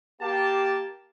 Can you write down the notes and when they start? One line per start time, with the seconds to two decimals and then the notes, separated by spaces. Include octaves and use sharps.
0.21 A#3 G4 A5